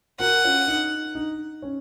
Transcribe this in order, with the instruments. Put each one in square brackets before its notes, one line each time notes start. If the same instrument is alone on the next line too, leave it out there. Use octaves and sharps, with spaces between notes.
[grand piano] F#4 A#4 [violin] F#5
[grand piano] C#4 F4
D#4
D#4
C#4